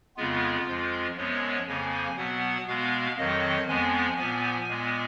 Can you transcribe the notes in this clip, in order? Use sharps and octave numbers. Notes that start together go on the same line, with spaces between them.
F2 C#3 G#3 B3 F4
F2 F3 G#3
F#2 F3 G#3 B3 C#5
F2 C#3 F3 A#3 G#5
B2 F#3 B3 F#5
B2 G#3 B3 F5
F2 D#3 F#3 D#5
F2 F3 G#3 B3 G#5
A#2 F3 B3
A#2 G#3 B3